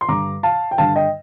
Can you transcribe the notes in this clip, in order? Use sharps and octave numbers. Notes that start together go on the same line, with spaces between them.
C6
G2 D3 A#5 D6
F5 A5
G5
G2 D3 F5 A5
D#5 G5